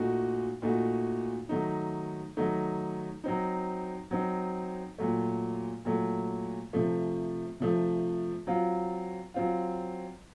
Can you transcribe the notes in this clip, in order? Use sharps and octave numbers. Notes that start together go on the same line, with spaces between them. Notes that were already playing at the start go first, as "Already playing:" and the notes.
Already playing: A#2 A3 D#4 F#4
A#2 A3 D#4 F#4
D#3 F#3 A3 D#4
D#3 F#3 A3 D#4
F#3 C4 D#4
F#3 C4 D#4
A#2 F#3 A3
A#2 F#3 A3
C3 F3 A3
C3 F3 A3
F#3 C4 F4
F#3 C4 F4